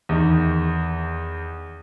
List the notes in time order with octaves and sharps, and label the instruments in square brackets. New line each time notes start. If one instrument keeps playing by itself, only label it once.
[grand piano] E2 D#3